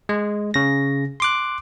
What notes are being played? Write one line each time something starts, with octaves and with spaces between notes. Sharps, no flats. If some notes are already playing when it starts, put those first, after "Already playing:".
G#3
C#3 A#6
C6 D6 F#6